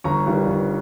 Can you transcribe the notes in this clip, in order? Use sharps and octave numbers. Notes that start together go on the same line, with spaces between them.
G1 A#5 C#6
G2 D#3 G3
G1